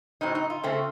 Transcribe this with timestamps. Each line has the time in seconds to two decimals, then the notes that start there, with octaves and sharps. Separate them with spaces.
0.21 A2 F#3 C4 D#4
0.35 D#4
0.50 F4
0.63 C#3 A3 C4